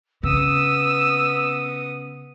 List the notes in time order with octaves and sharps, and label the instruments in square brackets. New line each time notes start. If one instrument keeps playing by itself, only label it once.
[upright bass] C#3 [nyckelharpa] B3 D#6 [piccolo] E6